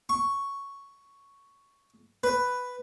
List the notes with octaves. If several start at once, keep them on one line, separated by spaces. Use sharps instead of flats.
C#6
B4